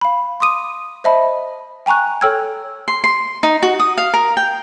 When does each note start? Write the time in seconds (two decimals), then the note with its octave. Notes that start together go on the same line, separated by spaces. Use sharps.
0.01 F5 B5
0.40 C6 D6 D#6 D#7
1.04 C5 D#5 E5 A5 B5
1.86 G5 G#5 A#5 C#6 F#6
2.21 A4 C#5 G5 E6 F6 G#6
2.88 C6
3.04 C6
3.43 D#4
3.63 F#4
3.79 D#6
3.98 F5
4.14 A#4
4.37 G5